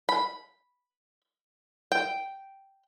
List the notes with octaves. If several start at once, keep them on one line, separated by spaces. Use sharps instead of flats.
B5
G5